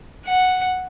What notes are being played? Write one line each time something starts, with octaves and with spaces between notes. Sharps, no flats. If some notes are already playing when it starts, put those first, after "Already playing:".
F#5